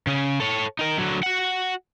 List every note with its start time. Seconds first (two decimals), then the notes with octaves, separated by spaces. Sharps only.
0.07 C#3 C#4
0.40 A4 C#5
0.79 D#4 A#4
0.98 D3 F#3
1.23 F#4 F#5